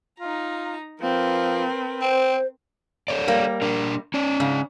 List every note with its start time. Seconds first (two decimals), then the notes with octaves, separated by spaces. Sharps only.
0.20 D#4 F4 A#5
1.02 F3 C4 A#4 B4
2.02 C4 C5
3.08 A4 C#5 D5
3.28 G3 A#3
3.62 D4 A#4
4.14 C#4 D5
4.40 G#2 C#3